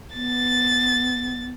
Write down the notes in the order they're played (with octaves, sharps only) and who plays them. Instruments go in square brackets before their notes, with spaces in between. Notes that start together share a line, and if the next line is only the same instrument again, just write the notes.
[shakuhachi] B3 [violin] A6